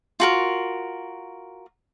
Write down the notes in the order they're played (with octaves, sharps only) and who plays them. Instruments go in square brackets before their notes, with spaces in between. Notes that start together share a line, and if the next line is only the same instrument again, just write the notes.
[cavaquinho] F4 F#4 A#4